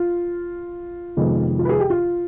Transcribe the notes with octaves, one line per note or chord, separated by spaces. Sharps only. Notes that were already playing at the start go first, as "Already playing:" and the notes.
Already playing: F4
F2 C3 D#3 G#3 B3
F4
B4
G#4
G4
F4